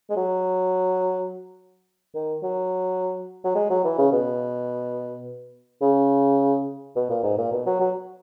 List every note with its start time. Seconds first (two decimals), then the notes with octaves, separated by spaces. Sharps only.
0.10 G#3
0.16 F#3
2.14 D#3
2.43 F#3
3.44 F#3
3.55 G#3
3.70 F#3
3.85 E3
3.98 C#3
4.12 B2
5.82 C#3
6.96 B2
7.10 A#2
7.23 G#2
7.38 A#2
7.52 B2
7.66 F#3
7.80 F#3